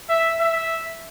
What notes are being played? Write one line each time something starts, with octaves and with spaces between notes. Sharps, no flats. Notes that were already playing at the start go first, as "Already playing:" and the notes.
E5
E5